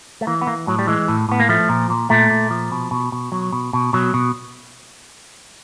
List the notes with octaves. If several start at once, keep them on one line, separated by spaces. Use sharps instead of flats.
A3
E3 A#3
B3
E3 A#3
A2 F#3
G3
E3 G#3
A2
A2 B3
A#3
F3 A3
A#2
A#2
A#2 A3
A#2
F3
B2
B2
B2
B2 F#3
B2
B2
B2 F#3
B2